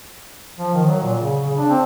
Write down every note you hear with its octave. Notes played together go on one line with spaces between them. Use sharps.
F3
D#3
F#3
A#2
C#3
C#3
D4
C4